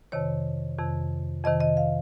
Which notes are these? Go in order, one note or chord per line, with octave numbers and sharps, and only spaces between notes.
F2 C3 D#3 C#5
F2 C3 D#3
F2 C3 D#3 D#5
D#5
F5